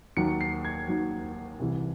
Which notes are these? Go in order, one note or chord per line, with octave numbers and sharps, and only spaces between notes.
D#2 D#3 F#3 C#7
C7
G#6
D#2 D#3 F#3
C2 C3 E3